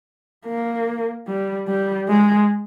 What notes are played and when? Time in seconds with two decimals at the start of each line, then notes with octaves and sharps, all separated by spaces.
0.46 A#3
1.28 G3
1.68 G3
2.09 G#3